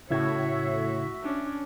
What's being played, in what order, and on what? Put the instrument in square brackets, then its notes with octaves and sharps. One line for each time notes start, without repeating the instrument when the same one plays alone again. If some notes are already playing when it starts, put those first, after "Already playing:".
[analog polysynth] A2 [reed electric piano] C#3 E4 G#6 [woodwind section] F#4 E5 [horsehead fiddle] C#5
[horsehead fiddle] C#4 D4